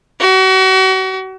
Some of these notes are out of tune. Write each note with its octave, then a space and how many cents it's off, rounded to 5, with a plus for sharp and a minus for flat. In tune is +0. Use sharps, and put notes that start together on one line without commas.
F#4 +35